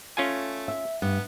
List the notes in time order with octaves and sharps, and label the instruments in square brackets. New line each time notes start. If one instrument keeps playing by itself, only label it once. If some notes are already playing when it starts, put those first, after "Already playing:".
[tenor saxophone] A3 [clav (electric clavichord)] C#4 F4 G#5
[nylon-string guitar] E5
[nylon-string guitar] G2 [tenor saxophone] B3